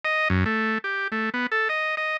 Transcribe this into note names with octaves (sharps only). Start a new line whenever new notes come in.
D#5
F#2
A3
G4
A3
B3
A4
D#5
D#5